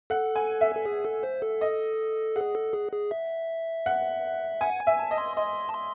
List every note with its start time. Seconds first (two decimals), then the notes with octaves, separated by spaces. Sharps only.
0.10 A4 F#5
0.36 G#5
0.61 E5
0.76 A4
0.85 G#4
1.05 A4
1.23 C5
1.42 A4
1.61 D#5
2.36 G#4 F#5
2.55 A4
2.73 G#4
2.92 G#4
3.11 E5
3.86 F#5
4.61 F#5 G#5
4.80 G#5
4.87 E5
4.99 A5
5.11 D#5
5.18 C6
5.37 D#5 C6
5.69 A5
5.74 C6